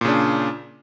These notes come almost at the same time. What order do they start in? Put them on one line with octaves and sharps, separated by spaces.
A#2 C#3 D4